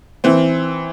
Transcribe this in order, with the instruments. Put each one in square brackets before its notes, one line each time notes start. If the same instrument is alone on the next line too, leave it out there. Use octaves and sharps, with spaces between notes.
[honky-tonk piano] E3 C4